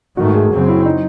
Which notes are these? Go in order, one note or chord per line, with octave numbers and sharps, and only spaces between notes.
G#2 D#3 A3 F#4
G#4
F#2 C#3 F#3 C4
E4
D#4